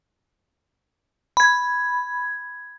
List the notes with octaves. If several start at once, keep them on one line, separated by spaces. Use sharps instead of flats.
B5 G#6